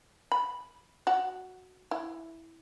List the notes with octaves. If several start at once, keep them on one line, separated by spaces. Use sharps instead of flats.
B5
F#4 F#5
E4